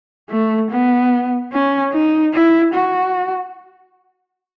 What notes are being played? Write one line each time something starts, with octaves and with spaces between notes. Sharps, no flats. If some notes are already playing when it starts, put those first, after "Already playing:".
A3
B3
C#4
D#4
E4
F#4